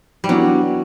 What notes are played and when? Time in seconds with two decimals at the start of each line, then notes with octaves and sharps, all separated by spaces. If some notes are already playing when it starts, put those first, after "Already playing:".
0.24 G3
0.29 E3 F#3 B3 D4